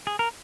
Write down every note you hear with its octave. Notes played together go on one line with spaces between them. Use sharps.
G#4
A#4